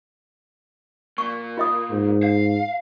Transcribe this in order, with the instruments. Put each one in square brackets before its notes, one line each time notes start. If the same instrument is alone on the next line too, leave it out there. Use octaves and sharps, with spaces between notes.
[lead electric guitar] A#2 [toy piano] C#6
[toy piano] F4 D#5 D#6
[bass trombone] G#2
[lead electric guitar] F5